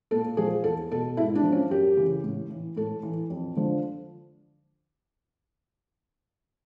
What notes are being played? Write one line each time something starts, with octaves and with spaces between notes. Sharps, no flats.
A#2 A4
F3 G#4
E2 A4
B2 A4
G#2 E4
D4
F3
C#4
F#2 G4
C#3 E3
A2
E3
A2 A4
E3
F2
D3 F3